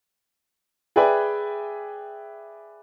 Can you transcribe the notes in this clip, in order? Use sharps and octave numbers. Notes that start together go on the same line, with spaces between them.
G#4 B4 D5 E5 G5 G#5